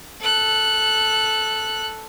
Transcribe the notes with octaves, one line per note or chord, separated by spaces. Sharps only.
A4 F#6